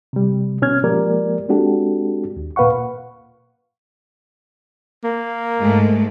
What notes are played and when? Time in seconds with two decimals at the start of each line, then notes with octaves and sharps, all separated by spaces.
0.13 C3 G3
0.62 B2 C#4 F6 G#6
0.84 F3 G#3 A#3 G4 A#4 D5
1.49 G#3 C4 D4 F#4 G4 A4
2.37 D#2
2.56 A#2 A#3 B4 F5 F#5 C#6
5.04 A#3
5.59 G#2 G#3 A3